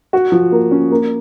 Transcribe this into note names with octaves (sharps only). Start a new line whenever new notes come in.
F#4
F3
A#3
C#4
A#3